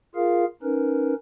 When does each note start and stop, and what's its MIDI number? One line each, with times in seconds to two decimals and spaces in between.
0.15 0.45 65
0.15 0.45 68
0.15 0.45 70
0.15 0.45 77
0.63 1.14 61
0.63 1.14 63
0.63 1.14 70
0.63 1.14 71